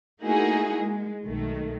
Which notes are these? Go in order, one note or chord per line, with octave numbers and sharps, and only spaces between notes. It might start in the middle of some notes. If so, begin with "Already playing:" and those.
A3 A#3 D#4 E4 F#4 G#4
G#3
B1 D#3 A3